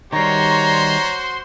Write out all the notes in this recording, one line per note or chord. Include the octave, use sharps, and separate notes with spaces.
D#3 G3 F#4 C5 C#5 A#5 C6